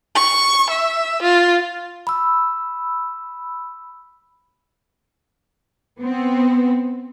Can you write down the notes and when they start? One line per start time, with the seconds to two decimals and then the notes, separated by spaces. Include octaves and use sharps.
0.15 C#6
0.70 E5
1.22 F4
2.07 B5 E6
6.00 B3 C4